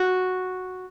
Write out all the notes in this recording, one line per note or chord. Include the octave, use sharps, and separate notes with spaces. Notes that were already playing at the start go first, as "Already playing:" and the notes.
Already playing: F#4